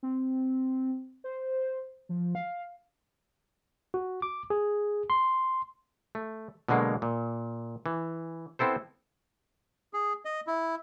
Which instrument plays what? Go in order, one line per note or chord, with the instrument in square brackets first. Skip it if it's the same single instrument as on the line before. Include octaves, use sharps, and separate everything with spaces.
[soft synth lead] C4
C5
F3
F5
[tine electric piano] F#4
D6
G#4
C6
[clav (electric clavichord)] A3
B2 D3 F#3 G#3 A#3
A#2
E3
B3 C4 E4 A4 C5
[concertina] G#4
D#5
E4